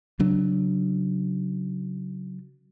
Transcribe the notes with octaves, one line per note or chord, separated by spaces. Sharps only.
C#3 F#3 D4